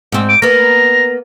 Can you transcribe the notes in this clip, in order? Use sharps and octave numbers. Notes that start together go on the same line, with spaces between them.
G#2 C4
D6
A#3 B3 A#5